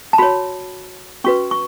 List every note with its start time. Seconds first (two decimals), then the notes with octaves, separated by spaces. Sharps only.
0.13 A5
0.18 F#4 C#5 B5
1.24 C#4 F#4 B4 C#6
1.51 C#6